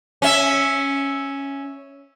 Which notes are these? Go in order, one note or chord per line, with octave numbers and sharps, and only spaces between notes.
C#4 E5